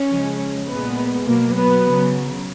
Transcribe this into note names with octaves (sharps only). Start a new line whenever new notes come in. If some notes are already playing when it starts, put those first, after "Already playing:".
Already playing: C#4
C#3 F3 G#3
A#2 G#3 B3
B2 F#3 A#3
B3
C#3 F#3